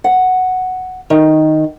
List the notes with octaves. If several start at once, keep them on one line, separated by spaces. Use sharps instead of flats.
F#5
D#3